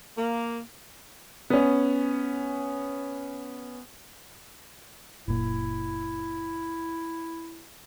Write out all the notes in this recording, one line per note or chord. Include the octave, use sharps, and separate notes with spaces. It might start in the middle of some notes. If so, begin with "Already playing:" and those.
A#3
B3 C#4
F#1 A#2 E4